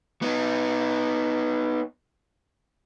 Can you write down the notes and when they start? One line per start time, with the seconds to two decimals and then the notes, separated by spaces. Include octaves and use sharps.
0.22 B3 D#4